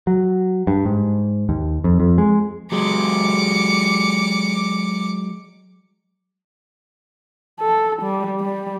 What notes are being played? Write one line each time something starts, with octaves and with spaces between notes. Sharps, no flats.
F#3
G2
G#2
D#2
F2
F2
G#3
F#3 G#3 D6 C#7
A4
G3
G3